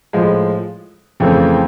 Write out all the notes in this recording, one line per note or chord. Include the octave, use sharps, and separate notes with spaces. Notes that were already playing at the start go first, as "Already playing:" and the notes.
A2 F3 G#3
F2 C#3 E3 A3 C4